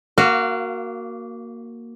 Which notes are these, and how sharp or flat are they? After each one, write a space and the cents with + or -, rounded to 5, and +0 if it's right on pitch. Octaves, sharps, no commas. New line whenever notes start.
A#3 +0 F#4 +0 F5 -25